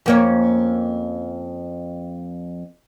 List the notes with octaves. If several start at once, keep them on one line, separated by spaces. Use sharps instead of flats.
F2 A#3 C#4